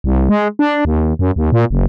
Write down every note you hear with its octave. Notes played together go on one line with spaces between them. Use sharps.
C2
G#3
D4
D#2
F#2
D#2
A#2
F#1